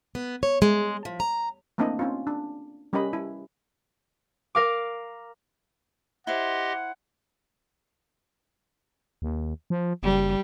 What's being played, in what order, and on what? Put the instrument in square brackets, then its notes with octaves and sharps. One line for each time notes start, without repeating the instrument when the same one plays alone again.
[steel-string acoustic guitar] B3
C#5
G#3
F3
A#5
[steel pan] A3 A#3 C4 D4 E4 D#5
C4 C#4 D#4 F4
D4
G3 C#4 G4 A#4 D#5 B5
E4
[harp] A#4 F5 D6
[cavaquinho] E4 C5 [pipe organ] G4 D#5 C6 [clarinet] F#5
[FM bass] D#2
F3
[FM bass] F#1 [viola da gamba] G3